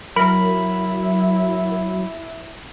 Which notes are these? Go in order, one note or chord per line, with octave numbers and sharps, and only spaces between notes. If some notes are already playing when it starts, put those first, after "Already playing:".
F#3 E4 A#4 B5